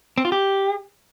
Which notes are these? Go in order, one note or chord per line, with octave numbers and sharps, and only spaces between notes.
C4
F4
G4